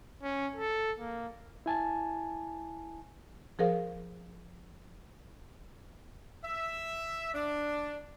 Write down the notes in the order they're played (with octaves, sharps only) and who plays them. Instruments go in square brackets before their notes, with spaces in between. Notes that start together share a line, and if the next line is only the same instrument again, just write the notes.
[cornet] C#4
A4
A#3
[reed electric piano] E4 G#5 A5
[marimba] F3 G#4 A#4 C5 F5
[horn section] E5
D4